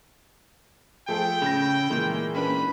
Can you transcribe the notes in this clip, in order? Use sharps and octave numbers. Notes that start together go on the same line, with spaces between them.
F3 A3 G#4 A4 G5
A2 C#3 G6 A#6
A#2 E3 G#3 A#3
C#4 D4 B4 B5